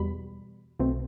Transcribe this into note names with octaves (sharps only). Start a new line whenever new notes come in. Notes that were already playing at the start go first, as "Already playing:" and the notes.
Already playing: E2 B2 G3 B5
B1 B2 A3 C4